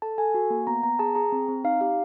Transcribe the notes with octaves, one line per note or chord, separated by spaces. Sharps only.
A4 A5
A4 G#5
F#4
A#3
B3 A#5
B3 A#5
G#4 A5
G#4 A#5
C4
C4
D#4 F5
G4 F5